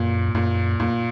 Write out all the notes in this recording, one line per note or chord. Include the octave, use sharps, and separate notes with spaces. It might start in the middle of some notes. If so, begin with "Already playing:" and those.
Already playing: F#2 A#2
G#2
F#2 A#2
F#2 A#2